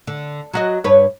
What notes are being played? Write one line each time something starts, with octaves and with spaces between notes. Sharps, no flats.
D3
F#3 F#4 D#5
G2 B4 C#5